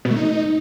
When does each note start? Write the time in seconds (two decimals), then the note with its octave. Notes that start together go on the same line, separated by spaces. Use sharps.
0.05 B2
0.11 A3
0.16 D#4